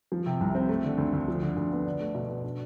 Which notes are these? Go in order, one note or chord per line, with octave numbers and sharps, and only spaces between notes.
F3
C3
C2
C4
A3
D3
D2
D2
F3
D3
D2
B3
D4
A3
B2
B2
D4